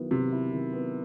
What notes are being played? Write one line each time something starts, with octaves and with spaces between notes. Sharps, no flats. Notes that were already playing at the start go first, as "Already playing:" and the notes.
Already playing: D#3 F#3 B3 E4
C3 F#3
E4
D#3
B3